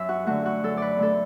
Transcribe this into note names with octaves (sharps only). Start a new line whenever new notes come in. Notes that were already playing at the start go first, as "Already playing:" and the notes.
Already playing: F#2 E5
F#4
D3 A3 F#4
F#4
F#2 A4
B4 D5
D3 A3 A4